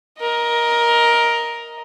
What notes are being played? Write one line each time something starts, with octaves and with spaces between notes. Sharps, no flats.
A#4 D#5